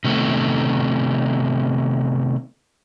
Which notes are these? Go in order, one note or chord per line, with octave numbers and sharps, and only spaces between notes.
C3 D#3 A3 B3